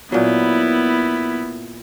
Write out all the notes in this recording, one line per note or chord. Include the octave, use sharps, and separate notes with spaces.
A#2 F#3 B3 E4